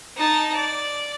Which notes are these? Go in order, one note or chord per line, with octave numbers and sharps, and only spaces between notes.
D#4 A5
D5